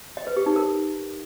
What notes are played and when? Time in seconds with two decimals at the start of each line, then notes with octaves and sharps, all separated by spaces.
0.17 D#5
0.27 B4
0.37 G4
0.46 D#4
0.56 A#4